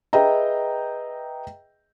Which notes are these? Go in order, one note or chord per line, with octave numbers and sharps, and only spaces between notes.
G#4 B4 D#5 E5 G5 A#5